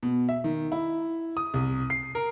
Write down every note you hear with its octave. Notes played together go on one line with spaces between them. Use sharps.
B2
E5
D#3
E4
D#6
C2
C7
A#4